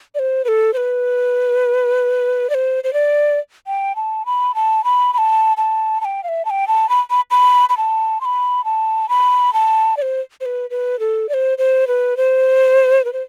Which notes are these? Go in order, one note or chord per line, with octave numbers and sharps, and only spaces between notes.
D5
C5
B4
A4
C5
B4
D5
C5
C5
D5
G5
A5
B5
A5
B5
B5
A5
A5
A5
G5
F5
E5
A5
G5
A5
B5
B5
B5
B5
A5
C6
B5
A5
B5
A5
D5
C5
C5
B4
B4
A4
D5
C5
C5
B4
C5
B4
C5